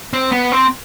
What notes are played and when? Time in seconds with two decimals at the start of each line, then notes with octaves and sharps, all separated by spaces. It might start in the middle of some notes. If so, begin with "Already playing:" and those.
0.13 C4
0.32 B3
0.52 C4